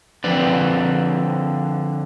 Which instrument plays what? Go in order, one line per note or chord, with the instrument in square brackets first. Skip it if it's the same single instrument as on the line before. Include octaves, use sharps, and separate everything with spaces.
[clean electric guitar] D3 F3 C4 B4 D5